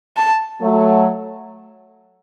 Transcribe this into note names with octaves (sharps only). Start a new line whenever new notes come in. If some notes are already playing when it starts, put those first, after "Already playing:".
A5
F#3 A3